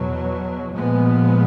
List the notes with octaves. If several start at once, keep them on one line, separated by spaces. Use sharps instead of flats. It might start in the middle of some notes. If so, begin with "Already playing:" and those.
Already playing: E2 B2 F#3
A#2 F3 G#3 B3